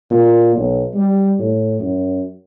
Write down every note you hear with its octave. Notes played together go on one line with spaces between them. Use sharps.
A#2
B1
G3
A2
F#2